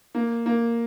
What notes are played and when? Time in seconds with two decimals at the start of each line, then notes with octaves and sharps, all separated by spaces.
0.15 A#3
0.46 A#3